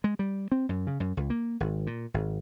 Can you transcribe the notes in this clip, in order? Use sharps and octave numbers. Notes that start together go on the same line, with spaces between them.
G#3
G3
C4
F#2
C#3
F#2
C#2
A#3
G#1
A#2
G#1